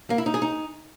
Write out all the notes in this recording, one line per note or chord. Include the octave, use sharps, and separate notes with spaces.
A#3
E4
D#4
G#4
D#4